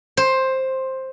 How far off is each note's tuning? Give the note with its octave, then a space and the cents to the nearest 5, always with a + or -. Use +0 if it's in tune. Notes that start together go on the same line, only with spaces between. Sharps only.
C5 +10